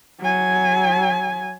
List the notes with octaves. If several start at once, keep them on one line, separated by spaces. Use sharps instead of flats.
F#3 G#5